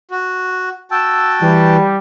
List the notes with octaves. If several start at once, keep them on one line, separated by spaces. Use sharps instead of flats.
F#4
F#4 G5 A5 E6
E3 G3